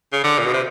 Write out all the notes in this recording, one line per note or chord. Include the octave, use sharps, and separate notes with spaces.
C#3
D3
A#2
B2
C3